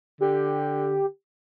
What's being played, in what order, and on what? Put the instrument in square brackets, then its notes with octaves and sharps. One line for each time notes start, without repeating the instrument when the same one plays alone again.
[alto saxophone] D3 [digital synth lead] G4